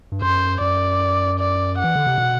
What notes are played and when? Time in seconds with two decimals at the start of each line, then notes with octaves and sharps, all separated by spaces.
0.12 G2
0.22 F#2 C5
0.61 F#2 D5
1.39 D5
1.79 E3 F#5
1.96 D3
2.07 C3
2.18 B2